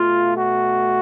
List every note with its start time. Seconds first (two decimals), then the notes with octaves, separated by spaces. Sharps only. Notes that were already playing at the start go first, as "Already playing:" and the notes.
Already playing: B2 A3 F4
0.36 F#4